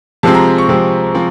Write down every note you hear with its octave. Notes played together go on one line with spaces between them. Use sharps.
C3 F3 G#3 C4 A5
A#5
C#6
C3 F3 G#3 C4
F3 C4